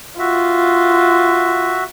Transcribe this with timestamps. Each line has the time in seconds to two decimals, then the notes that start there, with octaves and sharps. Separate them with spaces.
0.19 F4 F#4 E5